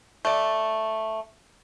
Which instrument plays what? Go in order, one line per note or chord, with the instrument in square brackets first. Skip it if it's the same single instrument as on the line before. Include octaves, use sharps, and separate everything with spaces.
[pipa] A3 D5